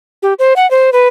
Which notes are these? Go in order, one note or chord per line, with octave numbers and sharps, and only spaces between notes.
G4
C5
F#5
C5
B4